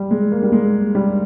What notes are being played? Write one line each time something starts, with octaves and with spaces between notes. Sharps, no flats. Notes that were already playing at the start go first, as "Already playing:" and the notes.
Already playing: G3
G#3
A#3
G3
G#3
G3